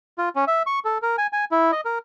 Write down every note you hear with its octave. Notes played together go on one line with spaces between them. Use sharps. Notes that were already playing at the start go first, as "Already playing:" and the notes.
F4
C#4
E5
C#6
A4
A#4
G#5
G#5
E4
D#5
A#4